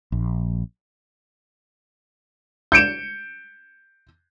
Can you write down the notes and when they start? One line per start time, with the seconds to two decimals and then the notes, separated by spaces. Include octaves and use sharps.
0.12 A#1
2.72 G6 C#7 D7 E7